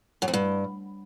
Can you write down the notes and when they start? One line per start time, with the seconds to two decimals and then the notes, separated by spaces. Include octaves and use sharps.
0.22 F#2
0.28 F2
0.33 G2